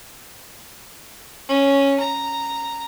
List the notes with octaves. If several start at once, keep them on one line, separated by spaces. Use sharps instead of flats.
C#4
A#5